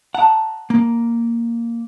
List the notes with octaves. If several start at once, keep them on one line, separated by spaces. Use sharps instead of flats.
F#5 A5 A#5 D#6
A#3